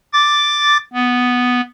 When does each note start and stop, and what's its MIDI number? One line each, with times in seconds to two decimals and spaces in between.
0.13 0.77 86
0.13 0.77 93
0.93 1.61 59